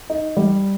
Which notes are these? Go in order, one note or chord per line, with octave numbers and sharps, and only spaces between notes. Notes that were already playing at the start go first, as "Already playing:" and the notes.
D#4
G3